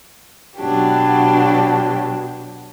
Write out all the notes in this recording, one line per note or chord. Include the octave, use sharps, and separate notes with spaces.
B2 F#3 D4 G4